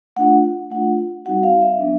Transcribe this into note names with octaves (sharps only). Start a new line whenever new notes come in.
A3 D4 F4 F#5
A3 D4 F4 F#5
G3 C4 D#4 F#4 F#5
F5
E5
F#3 B3 D4